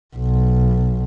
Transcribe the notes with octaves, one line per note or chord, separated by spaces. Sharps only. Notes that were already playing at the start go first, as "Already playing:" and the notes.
B1